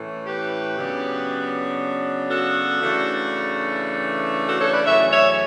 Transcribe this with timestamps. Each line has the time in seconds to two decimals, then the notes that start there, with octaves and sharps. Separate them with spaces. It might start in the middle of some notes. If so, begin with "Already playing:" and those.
Already playing: A2 E3 A3 C#4
0.26 G4 B4
0.77 C#3 F#3 B3 D4
2.30 F#4 A4
2.81 C#3 E3 A3 D4
4.47 F#4 A4
4.60 A4 C#5
4.72 B4 D5
4.85 F#2 C#3 E3 A3 C#4 C#5 E5
5.11 C#5 E5